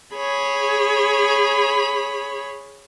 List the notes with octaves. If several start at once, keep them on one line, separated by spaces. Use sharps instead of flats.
G#4 C#5 B5